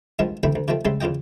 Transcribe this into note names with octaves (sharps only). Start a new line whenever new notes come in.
G2 B2 D#3 F3 G3 G#3
A1 D2 C4 E4 G5 B5
D2
C3 D#3 F3 A3 C4
C#3 G3 G#3 C4 E5 C6
E2 C#3 F4 D#5 G5